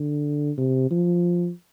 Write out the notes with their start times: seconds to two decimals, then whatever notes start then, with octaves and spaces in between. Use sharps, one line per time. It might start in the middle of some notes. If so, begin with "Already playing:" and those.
Already playing: D3
0.58 C3
0.91 F3